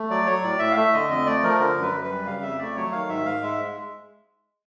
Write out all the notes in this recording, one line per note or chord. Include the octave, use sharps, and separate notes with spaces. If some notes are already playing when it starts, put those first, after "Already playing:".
Already playing: A3
F#3 D5
F#3 C#5
A2 D5
A2 E5
F5
A3 E5
D3 D#5
F2 D#5
A3 D5
F3 A#4
D3 A#4
F#2
B4
F#2
B4
G3
C#3 F5
F2 E5
A3 D5
F#3 C#5
D#3 F5
G#2 E5
G#2 F5
G#3 E5